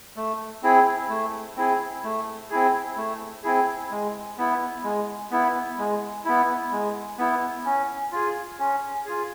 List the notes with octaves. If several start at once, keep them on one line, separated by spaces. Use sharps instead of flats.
A3
C4 E4 G#4
A3
C4 E4 G#4
A3
C4 E4 G#4
A3
C4 E4 G#4
G#3
B3 E4
G#3
B3 E4
G#3
B3 E4
G#3
B3 E4
C#4
F4 G#4
C#4
F4 G#4